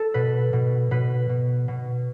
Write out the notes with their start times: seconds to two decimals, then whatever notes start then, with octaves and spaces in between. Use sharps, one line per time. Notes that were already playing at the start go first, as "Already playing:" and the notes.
Already playing: A4
0.14 B2 B4
0.53 B2
0.91 B2 B4
1.29 B2
1.68 B2